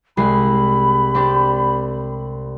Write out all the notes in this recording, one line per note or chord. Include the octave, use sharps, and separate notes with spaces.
C2 G#3 B5 C7
C4 D4 G4